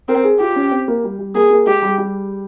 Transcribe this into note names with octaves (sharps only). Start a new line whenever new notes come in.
C4 A#4
G#4
F4 G4
C#4
C4
A#3
G3
G3
A#3 G#4
A#3
G#3 G4
G3
G3